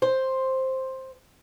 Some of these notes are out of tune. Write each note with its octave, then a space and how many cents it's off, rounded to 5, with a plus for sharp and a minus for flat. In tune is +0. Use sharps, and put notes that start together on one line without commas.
C5 +5